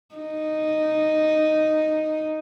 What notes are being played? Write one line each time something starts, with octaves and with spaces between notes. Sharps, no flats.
D#4